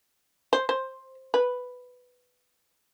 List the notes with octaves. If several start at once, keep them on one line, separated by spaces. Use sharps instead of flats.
C5
C5
B4